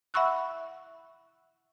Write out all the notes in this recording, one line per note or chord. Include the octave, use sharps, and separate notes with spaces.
E5 F#5 B5 C#6 E6 F#6